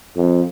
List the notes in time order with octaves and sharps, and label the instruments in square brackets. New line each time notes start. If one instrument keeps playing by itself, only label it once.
[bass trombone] F2